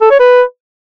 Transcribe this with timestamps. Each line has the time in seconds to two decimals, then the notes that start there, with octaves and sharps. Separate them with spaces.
0.01 A4
0.10 C#5
0.20 B4